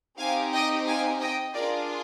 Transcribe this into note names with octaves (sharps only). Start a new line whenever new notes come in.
C4 D#4 G4 F5 G#5
D#5 G5
F5 G#5
D#5 G5
D4 F4 G#4 A#4 D5